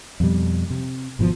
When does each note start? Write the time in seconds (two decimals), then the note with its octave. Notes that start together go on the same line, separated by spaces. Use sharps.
0.20 F2 B2 G3
0.70 C3
1.19 G#1 B2 D3 F3